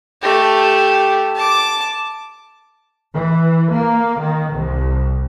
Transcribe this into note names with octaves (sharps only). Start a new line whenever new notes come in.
A3 G4
A5 D6
E3
A#3
D#3
C2